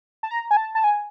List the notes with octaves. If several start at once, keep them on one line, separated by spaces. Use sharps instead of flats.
A5
A#5
G#5
A5
A5
G#5